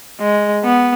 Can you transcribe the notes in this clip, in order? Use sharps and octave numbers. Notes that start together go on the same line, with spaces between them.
G#3
B3